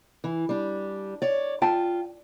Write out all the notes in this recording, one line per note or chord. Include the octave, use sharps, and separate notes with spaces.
E3
G3 D4
C#5 D5
F4 G5 A5